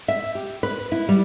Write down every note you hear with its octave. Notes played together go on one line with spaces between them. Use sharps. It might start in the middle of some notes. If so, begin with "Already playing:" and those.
E5
G4
B4
E4
G3